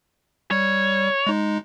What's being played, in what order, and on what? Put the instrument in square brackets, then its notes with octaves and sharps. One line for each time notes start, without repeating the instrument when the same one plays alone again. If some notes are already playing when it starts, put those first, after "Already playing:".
[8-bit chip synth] G3 [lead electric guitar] C#5
[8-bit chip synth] G#3 D#4